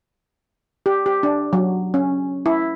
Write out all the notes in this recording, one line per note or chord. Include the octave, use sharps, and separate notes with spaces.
G4
G4
D4
F#3
C#4
E4